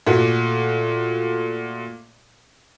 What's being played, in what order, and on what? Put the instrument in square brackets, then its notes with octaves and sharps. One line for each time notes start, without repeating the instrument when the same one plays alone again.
[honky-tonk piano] A#2 A3 F#4